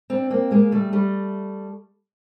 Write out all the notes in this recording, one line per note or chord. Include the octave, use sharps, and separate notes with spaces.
C4 D4
A#3 C4
G#3 A#3
G3 A3
G3 A3